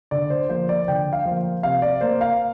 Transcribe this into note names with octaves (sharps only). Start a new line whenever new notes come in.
D3 D5
C5
F3 A#3 C5
D5
D3 G5
F5
F3 A#3
C3 F5
D5
A#3 C5
F5